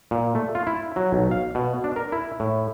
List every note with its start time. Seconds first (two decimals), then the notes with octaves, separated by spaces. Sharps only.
0.11 A#2
0.35 A3
0.55 F4
0.67 E4
0.96 F#3
1.13 B1
1.31 F5
1.55 B2
1.84 D4
1.96 A#4
2.12 E4
2.40 A2